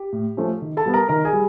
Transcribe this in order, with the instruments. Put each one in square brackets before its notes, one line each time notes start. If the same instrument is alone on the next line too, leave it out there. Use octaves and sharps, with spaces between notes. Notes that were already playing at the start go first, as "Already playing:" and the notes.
Already playing: [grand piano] G4
A2
F3 A3 C#4
D#3
A4 A5
G3 B3
A#4 A#5
D#3 A#4 A#5
G#4 G#5
G3